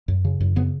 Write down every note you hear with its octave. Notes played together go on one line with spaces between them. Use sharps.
F#2
C#3
F#2
C#3 B3